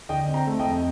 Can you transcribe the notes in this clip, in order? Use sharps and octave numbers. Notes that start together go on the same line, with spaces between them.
D3 D#5 G5
C4
G5 A#5
A3
D#5 G5
F2